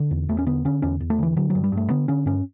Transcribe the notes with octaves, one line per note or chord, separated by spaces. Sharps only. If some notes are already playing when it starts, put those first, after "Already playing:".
Already playing: D3
E2
E2 A3
C#4
D3 B3
D3 C#4
E2 C#4
E2
A3
D3 E3
D3 F#3
F#3
G2
G3
G2
A3
D3 B3
D3 C#4
G2 C#4